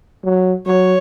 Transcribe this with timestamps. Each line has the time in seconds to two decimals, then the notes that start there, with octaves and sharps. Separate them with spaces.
0.25 F#3
0.67 F#3 C#5